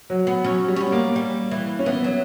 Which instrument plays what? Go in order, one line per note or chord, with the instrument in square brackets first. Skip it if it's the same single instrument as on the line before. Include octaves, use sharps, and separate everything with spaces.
[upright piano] F#3
[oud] B3
[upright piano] F#3 [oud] C#4
[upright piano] G3
[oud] C#4
B3
[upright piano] A#3
[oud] G3
E3
[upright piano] C#4
[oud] E3 [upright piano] B3
[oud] F#3